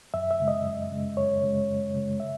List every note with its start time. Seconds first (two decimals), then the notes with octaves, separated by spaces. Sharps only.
0.14 F#2 E5
0.31 E5
0.40 C#3 G#3
0.48 D#5
0.65 F#2
0.91 C#3 G#3
1.17 F#2 C#5
1.43 C#3 G#3
1.69 F#2
1.95 C#3 G#3
2.20 E5